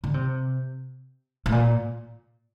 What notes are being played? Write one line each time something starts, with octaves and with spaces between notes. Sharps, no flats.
D3
C3
A2
A#2